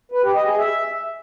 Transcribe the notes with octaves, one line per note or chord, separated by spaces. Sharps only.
B4
G4
D#5
G#4
E5